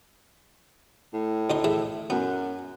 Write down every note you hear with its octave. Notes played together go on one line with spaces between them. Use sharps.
A2
D2 D#4 C6
E3 G#4 E5
F#2 B3